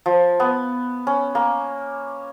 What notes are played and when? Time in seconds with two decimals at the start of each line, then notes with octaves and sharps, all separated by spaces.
0.06 F3
0.40 B3
1.07 C#4
1.35 A#3